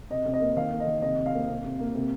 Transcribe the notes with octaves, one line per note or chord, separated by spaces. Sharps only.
C3 D#5
C3
D#5
A#3
D#3 F5
A#3
D#5
D#3
C3 D#5
C3
F5
A#3
C3
C3
A#3
C3